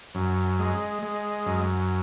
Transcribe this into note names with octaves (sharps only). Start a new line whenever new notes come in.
F#2
G#3
G#3
F#2